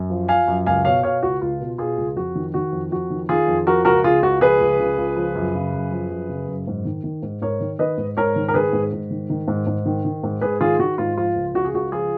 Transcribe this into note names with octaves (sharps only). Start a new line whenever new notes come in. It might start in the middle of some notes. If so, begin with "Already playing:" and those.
Already playing: F#2
F3
F3 F5 G#5
F#2
C#2 F5 G#5
B2 C#5 F5
B2 C#5 F5
C#2 F#4
C#2 F4
B2
B2 F4 G#4
C#2
F2 F#4
D#3
D#3 F#4
F2
F2 F#4
D#3
D#3 F4 G#4
F2
F3 F#4 A#4
C#2 F#4 A#4
C#3 F4 G#4
C#2 F#4
F3 G#4 B4
C#2
C#3
C#2
F3
F#2
C#3
F#2
F3
F#2
C#3
F#2
G#2
D#3
D#3
G#2
G#2 A#4 C#5
D#3
D#3 B4 D#5
G#2
G#2 A#4 C#5
D#3
A#4
D#3 G#4 B4
G#2
G#2
D#3
D#3
G#2
G#2
D#3
D#3
G#2
G#2 G#4 B4
D#3 F4 G#4
D#3 F#4
G#2 F4
F3 F4
C#2
C#3 F#4
G#4
C#2 F#4
F3 F4 G#4